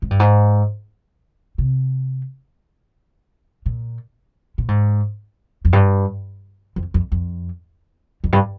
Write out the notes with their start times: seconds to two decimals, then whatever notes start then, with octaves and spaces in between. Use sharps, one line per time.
0.02 G#2
0.11 G2
0.20 G#2
1.58 C3
3.66 A#2
4.58 A#2
4.68 G#2
5.65 F2
5.73 G2
6.76 F2
6.94 F2
7.12 F2
8.24 F2
8.33 G2